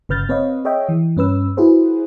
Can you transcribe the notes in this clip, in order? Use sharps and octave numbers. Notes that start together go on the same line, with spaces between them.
G1 C#3 B4 F6 G6 A6
C4 B4 C#5 D#5 F5
G#4 C#5 D#5 E5 G5
E3
G2 C#4 B4 E6
E4 F#4 G#4 B4 C5